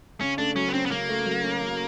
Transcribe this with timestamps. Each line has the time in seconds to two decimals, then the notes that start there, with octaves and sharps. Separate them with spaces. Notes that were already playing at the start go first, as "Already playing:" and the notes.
0.21 C#3 C#4
0.38 A3 D4
0.55 F#3 C#4
0.69 B3
0.73 C4 C#4
0.86 B3
0.91 C#3 A#3
1.09 A3
1.26 F#3
1.43 C#4
1.61 C#3